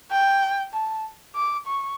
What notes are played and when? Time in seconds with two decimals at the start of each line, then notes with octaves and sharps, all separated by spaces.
0.11 G5
0.73 A5
1.35 D6
1.67 C#6